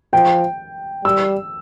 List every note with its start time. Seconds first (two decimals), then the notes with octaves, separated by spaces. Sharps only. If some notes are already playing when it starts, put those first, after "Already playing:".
0.13 F3 G5
1.04 G3 E6